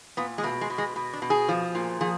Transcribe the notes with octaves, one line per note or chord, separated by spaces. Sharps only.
A#2 B3
G#3
B2 A3
G#3
B2
G#3
B2
D4
B2
G#4
F3
A#2
F3 G#4